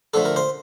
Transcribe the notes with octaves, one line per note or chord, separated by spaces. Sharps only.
D3 F3 A3 A4
A#4
C5